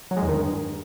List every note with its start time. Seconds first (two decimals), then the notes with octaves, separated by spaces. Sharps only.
0.11 F#3
0.17 G#3
0.22 E2
0.28 D#3
0.34 G2